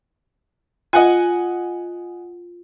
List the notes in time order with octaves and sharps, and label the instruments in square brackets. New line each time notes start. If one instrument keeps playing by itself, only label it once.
[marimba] F4 [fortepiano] D#5 F#5 G#5